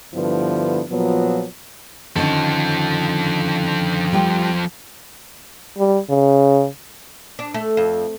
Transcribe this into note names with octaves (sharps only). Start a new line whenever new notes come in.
G2 D3 F3 B3 E4
A#2 F3 F#3 B3
D3 D#3 F3 C#4 A4
G3 F4 G5
G3
C#3
D4
A3
F2